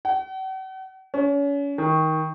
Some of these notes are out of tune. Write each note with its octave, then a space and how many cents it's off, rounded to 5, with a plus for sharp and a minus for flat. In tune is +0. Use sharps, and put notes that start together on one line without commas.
F#5 +45
C#4 +35
D#3 +15